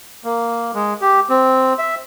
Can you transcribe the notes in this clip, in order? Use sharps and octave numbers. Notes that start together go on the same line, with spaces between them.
A#3
G#3
G4
C4
E5